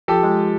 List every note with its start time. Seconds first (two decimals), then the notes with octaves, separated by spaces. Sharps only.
0.08 F3 G4 A4
0.23 G#3